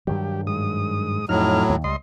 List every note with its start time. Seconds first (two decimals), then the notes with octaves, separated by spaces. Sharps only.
0.07 G2 D#3 F#3 G4
0.47 G#2 D#6
1.29 F2 A2 F#3 D#4 F6
1.69 D#2
1.84 C#2 G3 D#5 C6